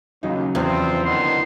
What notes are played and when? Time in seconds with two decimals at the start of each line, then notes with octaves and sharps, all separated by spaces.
0.23 D#2 C#3 F#3 D#4
0.55 E2 F3 C4
1.05 D3 D#3 B3 C6